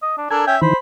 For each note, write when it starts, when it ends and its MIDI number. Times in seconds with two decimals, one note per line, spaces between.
0.02 0.14 75
0.17 0.30 62
0.31 0.45 62
0.31 0.44 69
0.31 0.45 70
0.31 0.55 80
0.47 0.57 61
0.47 0.57 76
0.47 0.56 79
0.62 0.73 51
0.62 0.73 52
0.62 0.77 72
0.62 0.77 83